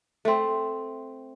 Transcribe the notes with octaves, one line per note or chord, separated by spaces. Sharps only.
A3 C4